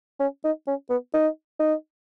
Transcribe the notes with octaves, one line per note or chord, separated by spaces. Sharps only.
C#4
D#4
C#4
B3
D#4
D#4